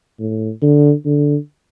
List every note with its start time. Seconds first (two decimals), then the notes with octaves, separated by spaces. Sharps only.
0.19 A2
0.62 D3
1.06 D3